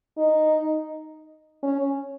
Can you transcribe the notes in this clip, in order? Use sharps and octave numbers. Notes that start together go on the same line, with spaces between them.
D#4
C#4